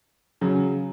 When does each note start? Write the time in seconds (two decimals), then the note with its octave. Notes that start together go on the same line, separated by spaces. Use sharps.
0.41 C#3 F#3 C#4